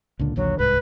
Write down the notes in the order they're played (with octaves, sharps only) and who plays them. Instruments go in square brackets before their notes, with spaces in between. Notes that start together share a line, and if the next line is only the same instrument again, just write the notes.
[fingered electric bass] C#2 A#2 D3
[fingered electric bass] A#1 D#2 D3 [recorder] F#3
[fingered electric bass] D1 C2 G#2 [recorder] B4